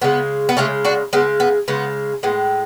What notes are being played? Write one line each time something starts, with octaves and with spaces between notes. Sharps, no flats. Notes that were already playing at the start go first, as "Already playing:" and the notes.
C#3 G#3 B3
B3
C#3 G#3 A3 C#4
D4 F#4
C#3 G#3 B3
B3
C#3 G#3 B3
A2 G#3 B3